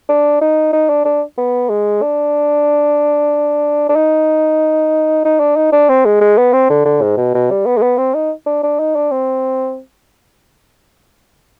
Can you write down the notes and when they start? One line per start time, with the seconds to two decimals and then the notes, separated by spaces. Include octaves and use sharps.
0.09 D4
0.42 D#4
0.73 D#4
0.89 D4
1.05 D4
1.38 B3
1.70 G#3
2.02 D4
3.89 D4
3.96 D#4
5.25 D#4
5.40 D4
5.57 D#4
5.72 D4
5.89 C4
6.05 G#3
6.21 G#3
6.38 B3
6.53 C4
6.70 D3
6.86 D3
7.02 G#2
7.17 B2
7.35 B2
7.51 G3
7.66 B3
7.77 G#3
7.82 B3
7.98 C4
8.15 D#4
8.46 D4
8.63 D4
8.80 D#4
8.96 D4
9.11 C4